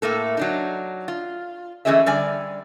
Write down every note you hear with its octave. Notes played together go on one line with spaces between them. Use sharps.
A2 A3 A#3 A4
F#3 D4 D#4
F4
E3 A3 C#4 G#4 D#5 E5
D3 G3 D5 G#5